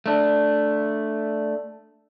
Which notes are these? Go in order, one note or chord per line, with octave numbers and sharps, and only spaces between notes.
A3 D4